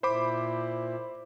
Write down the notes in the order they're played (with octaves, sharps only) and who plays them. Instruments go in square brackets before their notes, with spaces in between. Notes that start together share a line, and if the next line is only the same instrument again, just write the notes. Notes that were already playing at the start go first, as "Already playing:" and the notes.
[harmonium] A#2 E4 [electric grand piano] C5 B5 D6